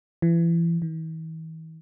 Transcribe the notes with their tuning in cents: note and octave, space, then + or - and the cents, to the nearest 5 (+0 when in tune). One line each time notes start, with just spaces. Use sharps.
E3 +30
E3 -45